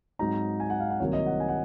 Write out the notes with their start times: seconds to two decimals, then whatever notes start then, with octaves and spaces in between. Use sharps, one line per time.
0.19 G#2 F#3 C4 D#4 A#5
0.60 G#5
0.70 F#5
0.80 F5
0.90 F#5
1.00 C2 C3 D#3 F#3 A#3 C#5
1.13 D#5
1.26 F#5
1.40 G#5
1.49 F#5